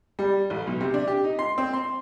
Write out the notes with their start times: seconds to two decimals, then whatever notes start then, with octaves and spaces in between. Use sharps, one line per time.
0.19 G3
0.50 A1
0.67 B1
0.81 C3
0.94 D4
1.08 G4
1.24 D#4
1.39 C6
1.58 C4
1.73 C6